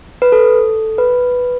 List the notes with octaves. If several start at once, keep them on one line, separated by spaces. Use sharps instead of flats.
B4
A4
B4